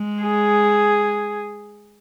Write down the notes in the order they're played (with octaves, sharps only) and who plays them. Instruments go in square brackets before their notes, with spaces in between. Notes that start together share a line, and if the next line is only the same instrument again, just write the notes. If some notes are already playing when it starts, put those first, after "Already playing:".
Already playing: [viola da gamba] G#3
[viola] G#4